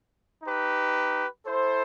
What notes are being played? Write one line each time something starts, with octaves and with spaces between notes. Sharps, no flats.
D#4 G4 B4
E4 A4 C5